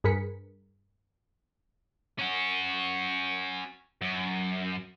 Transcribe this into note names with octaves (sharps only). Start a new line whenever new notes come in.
G2 G#4 A#4 B4 B6 C#7
C#4 F#4
F#2